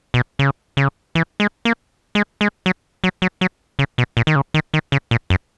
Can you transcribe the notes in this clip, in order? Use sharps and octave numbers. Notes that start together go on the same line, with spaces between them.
B2
C#3
C#3
E3
G#3
A#3
G#3
G#3
F#3
F#3
F#3
F#3
C#3
B2
A#2
D#3
C#3
D#3
D#3
C#3
A#2
F#2